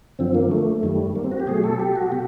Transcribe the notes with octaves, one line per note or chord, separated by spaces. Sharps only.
F#2 D3 F3 C4
A#3
A3
F#2 D#3 G3
A#3
C4
F#4
G4
B2 F#3 A3 G#4
A4
G4
F#4
B2 G4